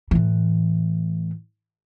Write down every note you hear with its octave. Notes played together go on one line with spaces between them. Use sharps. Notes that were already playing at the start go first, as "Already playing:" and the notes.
A2 E3